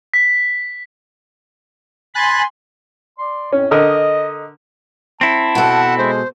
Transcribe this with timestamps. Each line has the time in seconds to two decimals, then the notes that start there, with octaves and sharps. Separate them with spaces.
0.14 B6
2.15 G#5 B5 C6 F#6 A6
3.19 D5 C6
3.52 F2 A2 C#4
3.71 D3 A#4 D#5 D#6
5.21 C4 E4 A5
5.55 B2 A4 F#5
5.98 G#3 C5